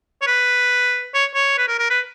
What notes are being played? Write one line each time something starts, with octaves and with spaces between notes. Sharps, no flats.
C#5
B4
C#5
C#5
B4
A#4
A#4
B4